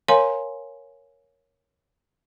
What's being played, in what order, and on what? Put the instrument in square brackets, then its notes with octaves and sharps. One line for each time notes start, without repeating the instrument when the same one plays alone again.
[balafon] A#4 C#5 F5 G#5 A#5 C6